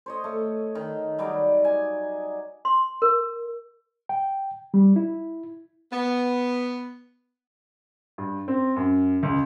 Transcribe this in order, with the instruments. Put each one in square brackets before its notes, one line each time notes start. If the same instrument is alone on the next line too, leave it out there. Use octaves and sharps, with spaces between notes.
[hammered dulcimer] C5 C#5 D#5
A3 C#5
D#3
F#3 G3 D#4 D5
G#5
[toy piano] C6
A#4
[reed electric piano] G5
G3
E4
[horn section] B3
[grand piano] G2
C4
F#2
C#2